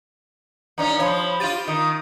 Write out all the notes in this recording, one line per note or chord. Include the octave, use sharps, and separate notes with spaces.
G2 C#4 D#4 A#5
F3 C#5 B5 C6
F4 G4 A6 D#7
D#3 D#6